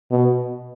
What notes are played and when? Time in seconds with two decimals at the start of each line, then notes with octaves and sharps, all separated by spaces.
0.11 B2